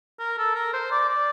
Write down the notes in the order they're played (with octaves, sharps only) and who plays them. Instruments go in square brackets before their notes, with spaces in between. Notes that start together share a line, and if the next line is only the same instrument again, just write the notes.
[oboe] A#4
A4
A#4
C5
D5
D5